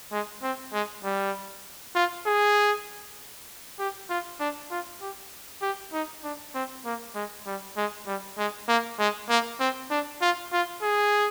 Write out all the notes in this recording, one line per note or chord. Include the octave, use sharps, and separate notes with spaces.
G#3
C4
G#3
G3
F4
G#4
G4
F4
D4
F4
G4
G4
D#4
D4
C4
A#3
G#3
G3
G#3
G3
G#3
A#3
G#3
A#3
C4
D4
F4
F4
G#4